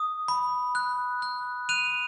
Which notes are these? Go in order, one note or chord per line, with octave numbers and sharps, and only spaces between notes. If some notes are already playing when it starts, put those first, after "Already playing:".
Already playing: D#6
B5
F#6
F#6
F#6 D#7 F7